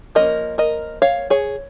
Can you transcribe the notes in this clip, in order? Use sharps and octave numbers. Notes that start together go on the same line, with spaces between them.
F3 A#3 C#4 A#4 D#5
A#4 D#5
C#5 F5
G#4 C#5